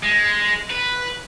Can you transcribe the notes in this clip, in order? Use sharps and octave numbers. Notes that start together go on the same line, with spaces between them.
G#3
B4